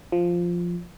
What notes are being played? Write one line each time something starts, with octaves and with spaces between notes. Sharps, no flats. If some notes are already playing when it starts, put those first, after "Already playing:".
F3